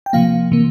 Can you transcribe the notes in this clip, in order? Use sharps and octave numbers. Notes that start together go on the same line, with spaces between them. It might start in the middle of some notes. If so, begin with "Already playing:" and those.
G5
C3 F3 A#3 F5
C3 E3 A#3